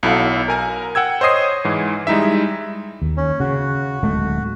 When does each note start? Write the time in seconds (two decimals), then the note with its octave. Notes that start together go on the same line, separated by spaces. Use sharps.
0.03 B1 F#3 E4 A4 F5 F#5
0.48 A#4 G#5 A#5
0.95 F#5 G5 E6 G#6
1.21 C5 C#5 D#5 D#6 C7
1.65 G#2 E3
2.07 G3 G#3 D#4 E4 E5
3.02 D#2
3.17 C#4
3.40 C#3 F#4
4.03 D1 G#3 A3